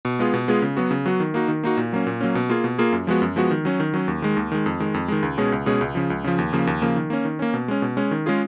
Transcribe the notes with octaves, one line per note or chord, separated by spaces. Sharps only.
B2
G#3 B3 F4 G#4
B2
G#3 B3 F4 G#4
C#3
F#3 B3 F#4
C#3
F#3 B3 F#4
D#3
A#3 D#4 F#4
D#3
A#3 D#4 F#4
A#2
F#3 A#3 C#4
A#2
F#3 A#3 C#4
B2
A#3 F4 G#4
B2
A#3 F4 G#4
F#2
F3 G#3 B3 F#4
F#2
F3 G#3 B3 F#4
D#3
F#3 C#4
D#3
F#3 C#4
D#2
D#3 G#3
D#2
D#3 G#3
F2
D#3 G#3
F2
D#3 G#3
C#2
B2 G#3 C#4 G#4
C#2
B2 G#3 C#4 G#4
C#2
C#3 F3
C#2
C#3 F3
D#2
C#3 F3 A#3
D#2
C#3 F3 A#3
D#3
A#3 C#4
D#3
A#3 C#4
B2
G#3 C#4
B2
G#3 C#4
D#3
G#3 C#4 F4 G#4